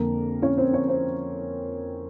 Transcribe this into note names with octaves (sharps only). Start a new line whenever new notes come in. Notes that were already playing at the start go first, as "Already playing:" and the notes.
Already playing: F2 D3 A#3 A#4
C#4 C#5
C4 C5
C#4 C#5
C4 C5